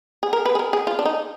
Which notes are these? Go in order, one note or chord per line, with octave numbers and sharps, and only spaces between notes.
G#4
A#4
B4
G#4
A#4
G#4
F4
D4
D#4